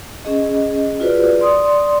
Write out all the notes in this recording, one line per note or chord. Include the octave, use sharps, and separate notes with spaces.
C#4 G#4 D#5
F4 F#4 G#4 B4 C5 D5
D5 C6 D#6